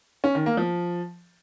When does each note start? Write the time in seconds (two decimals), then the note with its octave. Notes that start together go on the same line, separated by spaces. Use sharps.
0.24 C#4
0.35 D#3
0.46 A#3
0.57 F3